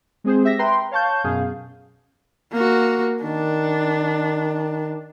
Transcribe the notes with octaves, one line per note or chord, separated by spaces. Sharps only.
G#3 C4 G#4 C5
G4 E5 A#6
B4 G5 A#5 C6
C#5 F5 A5 C#6 G6
F#2 B2 G#4 F5
A#3 F#4
D#3 D4